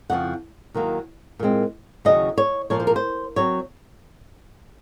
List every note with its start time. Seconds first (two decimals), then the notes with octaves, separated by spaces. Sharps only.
0.10 F2 C#3 F3 F#5
0.74 D#2 D#3 F#3 A#3
1.39 A#2 G#3 C4
2.05 D#2 C#3 F#3 C#4 D#5
2.38 C#5
2.70 A#2 F3 A#3 C#5
2.80 C5
2.87 A#4
2.96 C5
3.36 F#3 C4 C#5